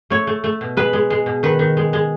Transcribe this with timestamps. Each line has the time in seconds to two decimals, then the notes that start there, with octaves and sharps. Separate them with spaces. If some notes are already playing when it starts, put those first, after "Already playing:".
0.10 A3 C#5
0.27 A3
0.44 A3
0.61 B2
0.77 G#3 B4
0.93 G#3
1.10 G#3
1.26 B2
1.43 D#3 B4
1.59 D#3
1.77 G#3
1.93 G#3